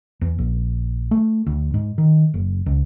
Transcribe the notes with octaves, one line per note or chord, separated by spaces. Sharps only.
E2
A#1
A3
D2
G#2
D#3
F#1
C#2